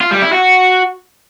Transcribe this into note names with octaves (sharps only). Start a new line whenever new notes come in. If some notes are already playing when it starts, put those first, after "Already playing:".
F4
G3
E4
F#4